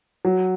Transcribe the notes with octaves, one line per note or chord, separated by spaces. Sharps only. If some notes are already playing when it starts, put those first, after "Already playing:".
F#3